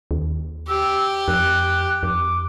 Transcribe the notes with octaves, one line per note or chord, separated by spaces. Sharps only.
D#2
G4 E6
F2 F#6
F2 D6